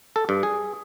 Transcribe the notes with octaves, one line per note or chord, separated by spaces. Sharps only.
A4
G2
G#4